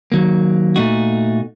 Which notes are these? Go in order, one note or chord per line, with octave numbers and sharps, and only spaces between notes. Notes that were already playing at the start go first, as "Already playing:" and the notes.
D#3 F#3 A#3
A#2 A3 D#4 F#4